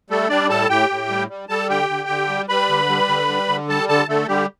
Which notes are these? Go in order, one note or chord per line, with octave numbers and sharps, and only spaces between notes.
G3 A3 A4
G3 D4 D5
A2 A4 A5
A2 G4 G5
A2
G3
G3
G3 A4 A5
D3 G4 G5
D3
D3
G3
G3 B4 B5
D3
G3
D3
G3
D3
G3 A4 A5
D3 A4 A5
D3 A3 A4
D3 G3 G4